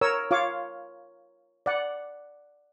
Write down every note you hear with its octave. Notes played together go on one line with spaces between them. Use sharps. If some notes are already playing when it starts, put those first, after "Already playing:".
A#4 C#5 E6
F4 C#5 F5 D6
D5 F#5